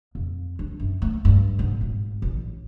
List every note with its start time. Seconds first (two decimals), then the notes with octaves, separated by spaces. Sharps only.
0.15 F2
0.59 D4
0.80 F#2
1.02 A3
1.25 G2
1.59 G#2
1.81 G#1
2.22 A1